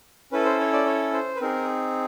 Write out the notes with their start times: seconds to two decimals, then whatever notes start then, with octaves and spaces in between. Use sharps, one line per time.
0.32 C#4 E4 A4 B4
0.45 C5
0.60 C#5
0.73 D5
0.86 C#5
1.13 C5
1.36 B4
1.41 C4 D#4 G#4 A#4